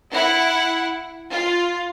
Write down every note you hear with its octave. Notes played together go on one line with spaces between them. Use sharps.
E4 F#5
F4